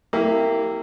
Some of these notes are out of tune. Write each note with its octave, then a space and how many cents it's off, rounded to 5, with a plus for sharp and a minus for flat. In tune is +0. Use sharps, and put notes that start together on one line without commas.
A#3 -25 E4 -5 G4 +0